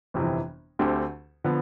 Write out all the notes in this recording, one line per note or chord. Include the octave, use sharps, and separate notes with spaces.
G1 F2 C3 E3
D2 D3 A3 C4 G4
D3 F3 B3